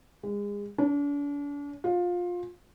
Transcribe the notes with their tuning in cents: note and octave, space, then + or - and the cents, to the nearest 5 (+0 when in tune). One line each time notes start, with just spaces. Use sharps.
G#3 -30
D4 -40
F4 +20